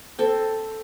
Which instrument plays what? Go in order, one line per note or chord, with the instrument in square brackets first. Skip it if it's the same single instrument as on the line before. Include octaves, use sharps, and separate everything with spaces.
[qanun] C4 A4